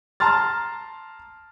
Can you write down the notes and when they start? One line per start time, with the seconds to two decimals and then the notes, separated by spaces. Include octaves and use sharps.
0.20 A5 A#5 C6 F6 A6